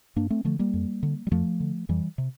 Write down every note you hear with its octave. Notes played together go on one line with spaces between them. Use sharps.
G2 A#3 D4
A3 C4
D3 F3 A3
G3 A#3
F2
D3
G3
F2 F3 A3
D3
F2 E3 G3
C3